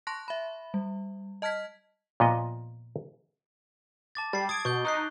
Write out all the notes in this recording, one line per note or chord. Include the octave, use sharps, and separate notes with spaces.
A5 C6 C#6 F#6 A#6
E5 B5
G3
D#5 A5 F6 G#6 B6
A#2 F3 B3 D#5
A5 D6 A6
G3 A6 C7
D#6 G#6 D7
B2 C#6 G6 G7
D#4 D#6 F#6 C7